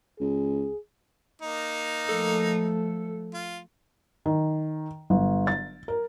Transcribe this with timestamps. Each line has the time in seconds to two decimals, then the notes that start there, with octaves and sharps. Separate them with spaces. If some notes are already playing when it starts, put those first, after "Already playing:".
0.20 C#2 G#4
1.41 A#3 D#4
2.09 F3 A3 A4
3.34 F4
4.26 D#3
5.10 G1
5.47 A6
5.88 A#4